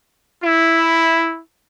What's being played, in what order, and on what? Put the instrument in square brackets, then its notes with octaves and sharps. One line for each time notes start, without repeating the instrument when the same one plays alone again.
[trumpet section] E4